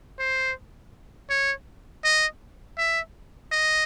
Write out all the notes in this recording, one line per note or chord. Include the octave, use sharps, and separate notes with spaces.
C5
C#5
D#5
E5
D#5